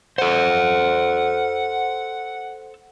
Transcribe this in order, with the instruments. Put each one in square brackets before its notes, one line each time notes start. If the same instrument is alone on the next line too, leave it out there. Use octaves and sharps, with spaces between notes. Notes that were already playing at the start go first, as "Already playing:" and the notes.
[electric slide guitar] A4 C5 [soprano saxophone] F#5